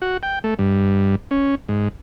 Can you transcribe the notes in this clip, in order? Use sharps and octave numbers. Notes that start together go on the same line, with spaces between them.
F#4
G5
A3
G2
C#4
G#2